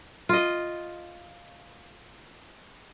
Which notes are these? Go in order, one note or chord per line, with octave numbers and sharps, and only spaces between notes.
F4 D#5